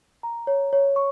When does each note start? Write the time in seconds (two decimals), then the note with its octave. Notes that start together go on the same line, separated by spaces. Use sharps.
0.23 A#5
0.47 C#5
0.73 C#5
0.96 C#6